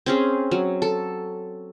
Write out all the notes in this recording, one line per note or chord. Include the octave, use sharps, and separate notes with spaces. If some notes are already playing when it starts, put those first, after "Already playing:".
C4 C#4 G#4
F#3
A4